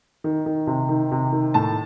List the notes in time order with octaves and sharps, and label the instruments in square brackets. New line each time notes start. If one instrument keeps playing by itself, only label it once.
[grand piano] D#3
D#3
C3
D#3
C3
D#3
A2 A5